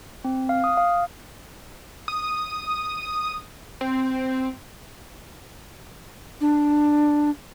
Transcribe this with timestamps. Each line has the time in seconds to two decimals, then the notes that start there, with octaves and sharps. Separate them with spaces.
0.25 C4
0.49 F5
0.64 D#6
0.77 F5
2.08 D#6
3.81 C4
6.41 D4